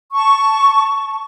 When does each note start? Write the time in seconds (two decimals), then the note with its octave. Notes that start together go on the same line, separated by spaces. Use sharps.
0.13 A5 C#6